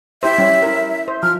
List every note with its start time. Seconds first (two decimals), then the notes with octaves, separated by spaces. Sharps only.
0.23 E4 G4 C5 E5
0.38 G3 C#4
0.62 E4 A#4
1.08 C5
1.23 F3 F6